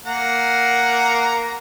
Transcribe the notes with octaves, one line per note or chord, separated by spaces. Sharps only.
A#3 F#5 A#5